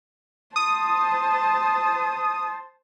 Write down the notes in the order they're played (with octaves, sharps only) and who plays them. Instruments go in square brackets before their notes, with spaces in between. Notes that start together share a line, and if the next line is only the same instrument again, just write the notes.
[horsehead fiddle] C5 A5 [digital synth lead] D#6